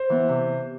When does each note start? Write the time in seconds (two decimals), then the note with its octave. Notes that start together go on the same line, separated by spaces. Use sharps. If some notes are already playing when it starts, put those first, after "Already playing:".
Already playing: C5
0.10 E3 B3
0.29 C3